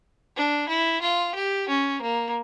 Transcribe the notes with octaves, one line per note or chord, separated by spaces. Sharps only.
D4
E4
F4
G4
C#4
A#3